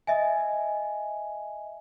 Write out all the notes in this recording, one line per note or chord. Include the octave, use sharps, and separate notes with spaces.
D#5 E5 G#5